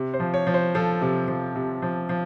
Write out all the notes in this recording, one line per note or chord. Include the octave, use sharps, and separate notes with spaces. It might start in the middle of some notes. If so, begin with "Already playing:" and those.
Already playing: C3
C5
F3
C#5
F3
C5
F3 A4
C3
F3
C3
F3
F3